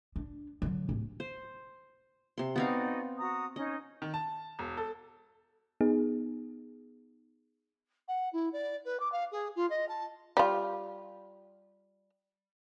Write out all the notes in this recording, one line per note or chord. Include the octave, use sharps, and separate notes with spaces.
D4
D3 F#3
D1 A1
C5
C3 C6
B3 C4 D#4 F#4 D5 F5
F#4 A#5 D#6
C#4 D#4 C#5 D#5
D#3
A5
E1
A4
B3 D#4 G#4
F#5
E4
D5
B4
D6
F5
G#4
F4
D#5
A5
G3 F4